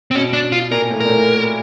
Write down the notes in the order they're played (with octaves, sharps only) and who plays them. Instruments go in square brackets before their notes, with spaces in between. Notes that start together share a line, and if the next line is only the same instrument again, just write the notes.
[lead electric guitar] C4
[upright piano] B2 [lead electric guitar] C#4
[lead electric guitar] D4
F4
[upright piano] A#2 [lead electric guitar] A#4
[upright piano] A2
[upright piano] A#2 [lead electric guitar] A#4
[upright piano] A2